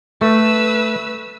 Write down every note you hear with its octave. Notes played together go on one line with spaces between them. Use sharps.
A3 B4 E6